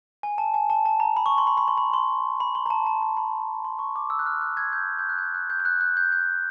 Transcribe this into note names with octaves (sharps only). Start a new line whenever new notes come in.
G#5
A5
G#5
A5
A5
A#5
B5
C#6
C6
B5
B5
C6
B5
C6
B5
C6
A#5
A5
A5
A5
B5
C6
C#6
D6
E6
F#6
F6
F#6
F#6 G#6
G6
G6
F#6
G6
F#6
G6
G6
F#6
F#6
G6
G6